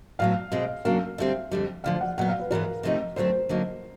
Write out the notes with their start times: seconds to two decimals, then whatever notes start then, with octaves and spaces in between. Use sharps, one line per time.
0.19 A2 F#3 B3 F5
0.52 B2 G#3 C4
0.85 C#3 F#3 A#3 D4 F5
1.18 D3 G3 C4 E5
1.51 F2 D3 G3
1.84 D2 D3 F3 F5
2.01 F#5
2.18 A#2 F#3 B3 F#5
2.28 F5
2.39 B4
2.51 G#2 E3 G#3 B3 A#4
2.83 C3 F3 A3 C4 D#4
3.16 D2 D3 F#3 A3 C4 C5
3.49 D3 F#3 A#3 D#4